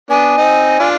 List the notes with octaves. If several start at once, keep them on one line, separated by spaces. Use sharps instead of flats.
B3 D4 G#5
C4 D#4
D4 F4